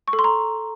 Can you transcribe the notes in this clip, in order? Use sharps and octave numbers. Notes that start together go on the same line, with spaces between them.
C#6
A4
C6
A#5